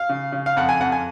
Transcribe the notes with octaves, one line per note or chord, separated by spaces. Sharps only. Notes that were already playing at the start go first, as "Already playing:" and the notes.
Already playing: F5
C#3
C#3
F5
F2 F#5
G#5
F2 F#5
G#5